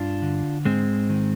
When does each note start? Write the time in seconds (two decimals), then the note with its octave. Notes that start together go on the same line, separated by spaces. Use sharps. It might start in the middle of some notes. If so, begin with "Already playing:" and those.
Already playing: G2 D4 F4
0.22 D3
0.65 G#2 G#3 C4
1.09 D#3